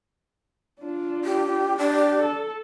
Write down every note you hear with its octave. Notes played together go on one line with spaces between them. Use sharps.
D4 F4
G4
D4 G4
A4